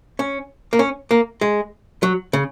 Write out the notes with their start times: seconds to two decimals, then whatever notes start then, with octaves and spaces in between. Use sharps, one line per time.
0.19 C#4
0.73 A#3
0.79 C#4
1.11 A#3
1.41 G#3
2.03 F#3
2.33 C#3